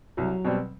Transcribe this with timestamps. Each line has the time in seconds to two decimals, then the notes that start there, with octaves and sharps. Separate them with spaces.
0.17 C2 F#3
0.45 B2 G3 C4